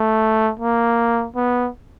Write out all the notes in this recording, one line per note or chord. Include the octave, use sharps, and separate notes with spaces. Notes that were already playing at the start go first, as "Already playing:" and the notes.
Already playing: A3
A#3
B3